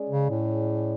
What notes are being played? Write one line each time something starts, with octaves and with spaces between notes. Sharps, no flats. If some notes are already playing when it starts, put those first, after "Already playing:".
Already playing: G#3 C#4 G#4 D5
C#3
A2